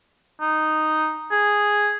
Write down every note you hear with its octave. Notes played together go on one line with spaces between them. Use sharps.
D#4
G#4